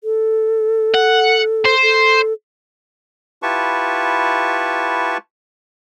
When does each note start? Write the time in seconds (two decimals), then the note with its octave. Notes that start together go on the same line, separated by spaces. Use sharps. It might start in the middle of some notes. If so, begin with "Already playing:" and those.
0.04 A4
0.94 F#5
1.65 C5
1.82 A4
3.43 E4 F4 G4 B4 A5 C#6